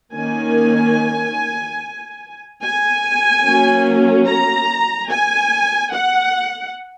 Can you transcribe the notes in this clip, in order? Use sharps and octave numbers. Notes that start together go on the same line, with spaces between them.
D#3 A#3 C#4 G#5
G#5
F#3 A#3 C#4
A#5
G#5
F#5